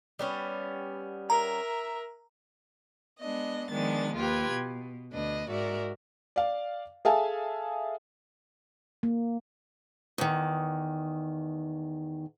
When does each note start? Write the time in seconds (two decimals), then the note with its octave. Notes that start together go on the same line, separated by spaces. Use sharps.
0.19 G3 B3 C#4
1.30 A#4 E5 A#5
3.20 G#3 B3 D4 D#5
3.70 D#3 F3 G#3 B3 D4 A6
4.16 D#2 F4 G4 B4 G#6
4.53 B2
5.12 D2 D4 B4 D#5
5.50 G#2 F#4 A#4 D5 E5
6.36 D5 F5
7.05 G#4 A4 E5 F5 G#5 A5
9.03 A#3
10.18 E2 D#3